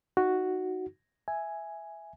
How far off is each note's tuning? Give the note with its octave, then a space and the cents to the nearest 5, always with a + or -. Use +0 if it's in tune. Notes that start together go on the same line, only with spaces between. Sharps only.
D#4 +0 F#4 +0
E5 +0 G#5 +0